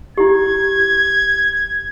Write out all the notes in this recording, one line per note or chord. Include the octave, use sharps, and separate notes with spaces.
E4 G4 G#6